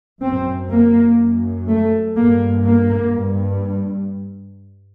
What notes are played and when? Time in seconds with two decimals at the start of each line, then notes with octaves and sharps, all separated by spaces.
0.21 F#2 C4
0.70 A#3
1.19 F#2
1.67 A3
2.16 G2 A#3
2.65 A#3
3.14 G2